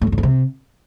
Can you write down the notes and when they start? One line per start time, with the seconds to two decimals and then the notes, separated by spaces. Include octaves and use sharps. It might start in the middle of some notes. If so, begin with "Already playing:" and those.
0.02 A2
0.07 F#2
0.12 A2
0.18 G#2
0.23 C3